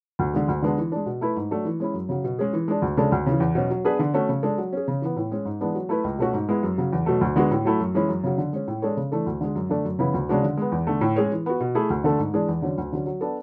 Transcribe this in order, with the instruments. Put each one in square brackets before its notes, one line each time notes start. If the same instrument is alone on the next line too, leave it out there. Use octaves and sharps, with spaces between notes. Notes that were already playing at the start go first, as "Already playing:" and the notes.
[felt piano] D2
D3 G#3
D2
D3 G#3 B3 D4
E3
G#3 D4
B2
A3 E4 B4
G#2
F#3 A3 D4
E3
G#3 C#4 E4
F#2
C#3 F#3
B2
G#3 C#4 G#4
E3
G#3 D4
D2
C#3 G#3 D4 A4
D2
C#3 E3
E2
B2 F#3 C#4
F#3
B3 D4 G#4 B4
D3
A3 C#4 F#4
C#3
G#3 D4 A4
F#3
C#4 G#4
C#3
E3 B3
A2
G#3 C#4
G#2
E3 G#3 B3 D4
F#3
A3 E4 B4
C#2
B2 A3 C#4 F#4
G#2
G#3 B3 E4
F#2
C#3 F#3
E2
B2 F#3 A3
D2
D3 G#3 B3 F#4
A2
F#3 A3 E4
F#2
E3 G#3 C#4 E4
F#2
C#3 F#3
D3
G#3 C#4
A2
G#3 D4 A4 C#5
C#3
E3 A3 D4 A4
D2
D3 G#3
F#2
D3 A3 D4 A4
F#2
C#3 E3 B3 E4
D2
C#3 G#3 D4 F#4
D3
G#3 B3
E2
D3 A3
A2
G#3 C#4 G#4 C#5
E3
B3 F#4
B2
A3 E4 G#4
D2
D3 A3 D4 A4
G#2
E3 G#3 D4 G#4
E2
D3 F#3 C#4
D2
D3 F#3 C#4
F#3
B3 D4 A4